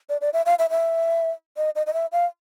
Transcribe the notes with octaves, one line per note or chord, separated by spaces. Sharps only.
D5
D5
E5
F5
E5
E5
D#5
D#5
D#5
E5
F5